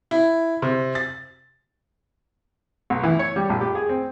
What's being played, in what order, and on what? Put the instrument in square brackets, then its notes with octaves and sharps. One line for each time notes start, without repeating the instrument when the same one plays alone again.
[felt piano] E4
C3
A6
[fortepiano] B1
E3
C#5
G3
A#1
G4
G#4
C4